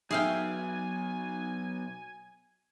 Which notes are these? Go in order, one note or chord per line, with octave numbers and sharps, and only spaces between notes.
B2 F#3 D#4 G#4 E5 F5 G5 G#5